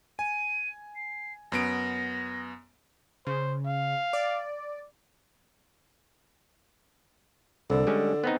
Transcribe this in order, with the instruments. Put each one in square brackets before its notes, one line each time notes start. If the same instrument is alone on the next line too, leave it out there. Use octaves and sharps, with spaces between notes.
[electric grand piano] G#5 [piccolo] D#7
[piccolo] C7
[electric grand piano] F#2 B3 D7 [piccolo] A#6
[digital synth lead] C#3 [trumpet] C5
[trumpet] F5
[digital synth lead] D5
[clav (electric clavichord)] C2 [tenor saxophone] D3
[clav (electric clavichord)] G3 G#3 C#4
B3 C4 D#4